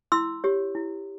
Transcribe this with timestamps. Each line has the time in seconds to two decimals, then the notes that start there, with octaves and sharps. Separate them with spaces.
0.12 E4 C6 E6
0.44 G4 C#5
0.75 E4